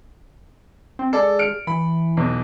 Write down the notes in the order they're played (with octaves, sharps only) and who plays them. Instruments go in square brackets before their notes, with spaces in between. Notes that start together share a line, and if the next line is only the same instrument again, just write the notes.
[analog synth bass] C4
[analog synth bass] G#3 [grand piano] A4 D5
[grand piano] F6 C#7 D7
[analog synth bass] E3 [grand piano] B5
[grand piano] B1 E2